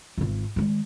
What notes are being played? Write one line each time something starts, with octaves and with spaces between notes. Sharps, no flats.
G#1 F4
D#3 G#3